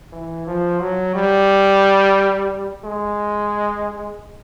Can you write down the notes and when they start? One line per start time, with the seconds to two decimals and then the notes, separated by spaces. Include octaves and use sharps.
0.12 E3
0.47 F3
0.81 F#3
1.15 G3
2.85 G#3